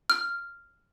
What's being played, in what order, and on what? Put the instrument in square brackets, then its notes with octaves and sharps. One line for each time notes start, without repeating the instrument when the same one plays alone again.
[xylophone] F6